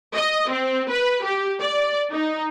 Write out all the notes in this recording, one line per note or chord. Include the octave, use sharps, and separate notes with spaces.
D#5
C4
B4
G4
D5
D#4